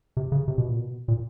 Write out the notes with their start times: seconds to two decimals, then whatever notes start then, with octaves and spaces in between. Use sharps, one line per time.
0.17 C3
0.32 C#3
0.48 C3
0.58 B2
0.69 A#2
0.80 B2
1.08 A#2